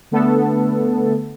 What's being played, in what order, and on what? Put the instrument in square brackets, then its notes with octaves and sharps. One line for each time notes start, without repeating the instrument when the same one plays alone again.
[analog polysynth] D3 A3 B3 A4